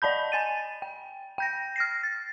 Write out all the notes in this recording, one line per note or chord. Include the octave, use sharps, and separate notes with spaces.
D5 D#5 A5 B5 G6
G#5 A6 D#7
G5
G5 G6 A#6
F6 A#6 C7
A6